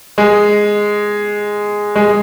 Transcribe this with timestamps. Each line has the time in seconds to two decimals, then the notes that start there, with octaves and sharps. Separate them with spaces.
0.18 G#3
1.95 G#3